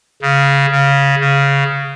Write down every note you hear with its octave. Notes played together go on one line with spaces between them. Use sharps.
C#3
C#3
C#3